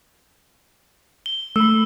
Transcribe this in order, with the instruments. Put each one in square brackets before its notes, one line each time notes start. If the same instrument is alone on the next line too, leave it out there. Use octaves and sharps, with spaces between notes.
[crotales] G7
[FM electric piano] A3 B5 [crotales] E6